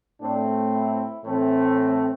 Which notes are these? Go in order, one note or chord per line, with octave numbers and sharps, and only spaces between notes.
A2 A3 C4 D4
E4
A2 E3 A3 C4